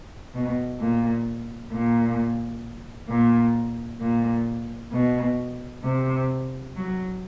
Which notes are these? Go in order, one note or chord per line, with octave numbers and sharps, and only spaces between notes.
B2
A#2
A#2
A#2
A#2
B2
C3
F#3